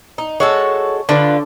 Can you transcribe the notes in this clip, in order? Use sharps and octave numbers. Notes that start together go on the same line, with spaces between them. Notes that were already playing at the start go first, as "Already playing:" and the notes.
D#4
G#3 F#4 A4 C#5
D3 D4 F4 B4